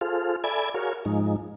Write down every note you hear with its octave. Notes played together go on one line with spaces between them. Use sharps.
F4 G#4 A4 C5 F5
A4 D5 E5 G#5 B5 G#6
F#4 G#4 A#4 C#5 F5
G#2 F3 G#3 D#4